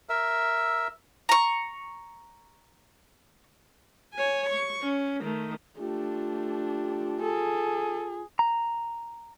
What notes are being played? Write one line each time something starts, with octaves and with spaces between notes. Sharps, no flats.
A#4 E5 E6
A#5 C#6
C#5 G#5
C#6
C#4
D#3 A3
A3 D4 F4 G4
G#4 A4
A#5